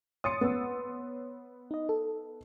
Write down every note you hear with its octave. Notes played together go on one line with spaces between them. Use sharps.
C#5 C6 D#6 A6 C#7
B3 E6
D#4 D#5
A4